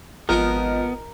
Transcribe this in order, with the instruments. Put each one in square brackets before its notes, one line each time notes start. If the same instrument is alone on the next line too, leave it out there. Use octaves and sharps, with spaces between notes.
[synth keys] G#1 D#5 [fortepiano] F3 [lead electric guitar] B3 [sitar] A#4